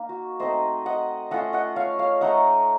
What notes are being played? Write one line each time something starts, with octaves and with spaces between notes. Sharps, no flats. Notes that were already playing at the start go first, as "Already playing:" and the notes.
Already playing: A#3 D#4
F#4
A3 C4 D#4 C5 D#5
D#5 F#5
A3 C#4 F4 D#5 F#5
D#5 F#5
C#5 F5
C#5 F5
A3 D#4 D#5 F#5